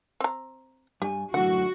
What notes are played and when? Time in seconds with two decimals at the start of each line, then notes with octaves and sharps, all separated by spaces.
0.20 C4 A#5
1.02 G2 G4 G#5
1.34 F#2 A2 D3 F#4 F#5